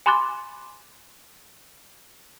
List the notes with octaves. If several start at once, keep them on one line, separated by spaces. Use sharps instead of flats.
G#5 B5 C6 D6 F#6 A6